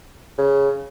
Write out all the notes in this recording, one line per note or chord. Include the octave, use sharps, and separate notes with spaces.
C#3